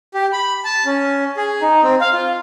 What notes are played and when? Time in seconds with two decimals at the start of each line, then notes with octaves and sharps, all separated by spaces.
0.14 G4
0.33 B5
0.65 A5
0.86 C#4
1.37 G#4
1.62 D#4
1.83 C4
2.01 F5
2.13 F4